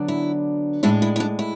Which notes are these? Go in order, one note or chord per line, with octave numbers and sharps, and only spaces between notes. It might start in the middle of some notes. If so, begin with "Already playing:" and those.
Already playing: D3 F#3 B3 D4
E4
A2 G#3 D4 E4
E4
E4
D4
E4